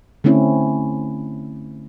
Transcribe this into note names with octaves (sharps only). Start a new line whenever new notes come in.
D3 A3 C4 C#4 E4